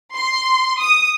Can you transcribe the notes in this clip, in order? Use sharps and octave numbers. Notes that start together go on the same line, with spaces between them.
C6
D#6